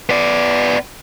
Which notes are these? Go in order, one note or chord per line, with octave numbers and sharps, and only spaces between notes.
B3 D5